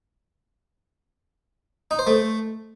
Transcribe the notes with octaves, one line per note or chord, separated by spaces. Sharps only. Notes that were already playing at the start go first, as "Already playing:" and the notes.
D#4
C5
A3